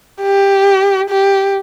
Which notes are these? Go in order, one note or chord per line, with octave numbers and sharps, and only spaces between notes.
G4
G4